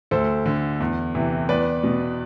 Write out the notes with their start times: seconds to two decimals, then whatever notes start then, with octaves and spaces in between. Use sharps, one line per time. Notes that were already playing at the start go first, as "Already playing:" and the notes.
0.11 D2 A4 C5
0.46 D3
0.80 E2
1.15 C3 E3
1.49 E2 B4 D5
1.83 B2